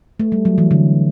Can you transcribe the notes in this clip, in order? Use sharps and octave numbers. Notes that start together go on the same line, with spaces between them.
A3
G3
F#3
E3
D3